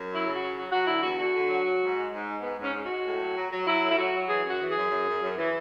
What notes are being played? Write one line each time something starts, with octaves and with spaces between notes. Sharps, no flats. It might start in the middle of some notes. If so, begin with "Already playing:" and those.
Already playing: F#2
F#3
E4
C#3
F#3 F#4
F#3 F#4
F#3 F#4
D3 E4
E2 F#4
D3 F#4
D3
F#3
F#3
G#2
G#3
G#2
G#3
G#2 B3
G#2
C#4
G#3
F#4
G#3
A2
F#3
F#3
F#3
F#3 E4
A2
E4
F#3 F#4
F#3
E3 G#4
F#2 F#4
E3
G#4
F#2
F#2
F#2
F#2
E3